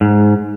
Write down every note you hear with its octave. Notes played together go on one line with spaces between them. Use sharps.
G#2